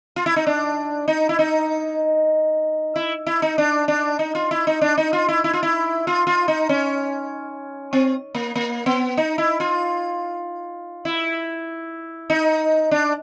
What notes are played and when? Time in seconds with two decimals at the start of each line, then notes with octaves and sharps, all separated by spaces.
0.16 F4
0.26 E4
0.36 D#4
0.47 D4
1.08 D#4
1.29 E4
1.39 D#4
2.96 E4
3.27 E4
3.42 D#4
3.58 D4
3.88 D4
4.19 D#4
4.35 F4
4.51 E4
4.67 D#4
4.81 D4
4.98 D#4
5.13 F4
5.28 E4
5.44 E4
5.53 F4
5.63 E4
6.07 F4
6.27 F4
6.48 D#4
6.69 C#4
7.93 C4
8.35 A#3
8.55 A#3
8.86 B3
9.17 D#4
9.38 E4
9.60 F4
11.05 E4
12.30 D#4
12.91 D4